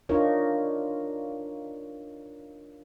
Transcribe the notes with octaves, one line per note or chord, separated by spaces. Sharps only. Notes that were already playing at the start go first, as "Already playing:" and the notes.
D4 D#4 F4 A#4 C#5